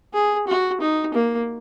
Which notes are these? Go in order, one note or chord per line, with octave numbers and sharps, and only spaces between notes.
G#4
F#4
D#4
A#3